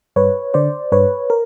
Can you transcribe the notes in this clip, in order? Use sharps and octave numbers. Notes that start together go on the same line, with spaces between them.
G2 B4 C#5
D3 C5 D5
G2 B4 C#5
A#4